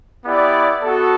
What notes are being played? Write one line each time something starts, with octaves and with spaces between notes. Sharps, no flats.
B3 E4 G4 D5
B3 F#4 A4